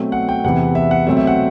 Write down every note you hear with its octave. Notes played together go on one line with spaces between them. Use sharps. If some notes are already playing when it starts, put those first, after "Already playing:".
Already playing: B2 F#3 A3 C4
F#5
G5
E2 C3 E3 F#5
E5
F#5
B2 F#3 A3 C4 E5
E5
F#5